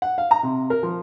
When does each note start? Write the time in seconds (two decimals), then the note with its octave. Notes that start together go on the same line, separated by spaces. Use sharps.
0.02 F#5
0.18 F5
0.31 A#5
0.43 C3
0.70 A#4
0.83 F3